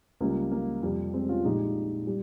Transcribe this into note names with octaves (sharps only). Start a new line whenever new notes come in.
C#2 C#3 G3 A#3
A#3
F2 C3 G3
G#3 C4
C#4 F4
A#1 A#2 G#3 D#4 G4
G3